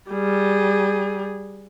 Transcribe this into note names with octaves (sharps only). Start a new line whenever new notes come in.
G3 G#4